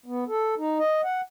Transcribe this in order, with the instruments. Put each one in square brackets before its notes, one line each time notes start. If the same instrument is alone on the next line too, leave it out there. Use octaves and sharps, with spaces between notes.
[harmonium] B3
A4
D#4
D#5
F#5